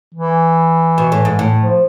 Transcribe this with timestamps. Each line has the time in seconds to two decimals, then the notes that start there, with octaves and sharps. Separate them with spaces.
0.14 E3
0.98 B2
1.12 A2
1.25 G#2
1.39 A2
1.60 F3